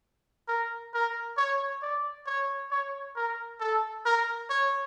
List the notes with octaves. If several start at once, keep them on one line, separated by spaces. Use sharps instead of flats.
A#4
A#4
C#5
D5
C#5
C#5
A#4
A4
A#4
C#5